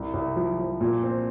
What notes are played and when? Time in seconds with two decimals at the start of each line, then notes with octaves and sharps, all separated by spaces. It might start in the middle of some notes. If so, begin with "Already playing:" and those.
Already playing: C2
0.14 C2
0.36 F3
0.59 F3
0.81 A#2
1.03 C4